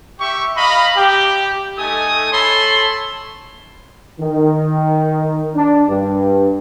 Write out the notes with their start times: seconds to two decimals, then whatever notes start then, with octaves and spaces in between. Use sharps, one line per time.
0.20 G4 E5 C#6
0.57 D#5 F5 A#5 B5
0.96 G4
1.78 A3 D#4 A4 G#5 D#6
2.33 A4 C#5 A5 B5 C6
4.20 D#3
5.55 D4
5.89 G2